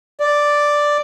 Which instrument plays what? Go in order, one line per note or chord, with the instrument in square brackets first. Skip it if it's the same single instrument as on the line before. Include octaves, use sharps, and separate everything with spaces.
[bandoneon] D5